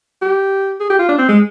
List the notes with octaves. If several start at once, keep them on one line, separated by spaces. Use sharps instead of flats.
G4
G#4
G4
F4
D4
C4
G#3